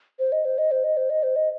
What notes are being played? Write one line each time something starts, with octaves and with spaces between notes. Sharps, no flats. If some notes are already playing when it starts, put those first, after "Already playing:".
C5
D#5
C5
D#5
C5
D#5
C5
D#5
C5
D#5